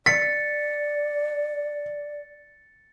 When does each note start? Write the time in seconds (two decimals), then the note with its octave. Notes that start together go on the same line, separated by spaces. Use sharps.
0.06 D5 A6 B6 C#7